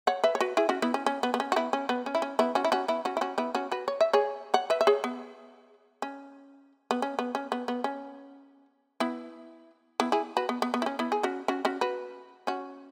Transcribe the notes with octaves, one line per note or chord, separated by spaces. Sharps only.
C#5 F#5
B4 E5
C#5
F#4 B4
E4 G#4
C#4 F#4
B3 E4
C#4
C#4
B3
B3
C#4
F#4
B3 E4
C#4
B3
C#4
E4
C#4
B3 E4
C#4 F#4
E4
C#4 F#4
B3 E4
C#4 F#4
E4
C#4 F#4
B3 E4
C#4 F#4
F#4 B4
C#5
E5
G#4 C#5
C#5 F#5
B4 E5
E5
G#4 C#5
B3
C#4
B3
C#4
B3
C#4
B3
B3
C#4
B3 E4
B3 E4
E4 G#4
F#4 B4
B3
B3
B3
E4
C#4
B3 E4
G#4
C#4 F#4
C#4 F#4
C#4 F#4
F#4 B4
C#4 F#4